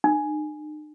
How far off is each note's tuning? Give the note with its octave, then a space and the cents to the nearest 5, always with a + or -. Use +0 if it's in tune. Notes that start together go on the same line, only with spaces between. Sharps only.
D#4 -45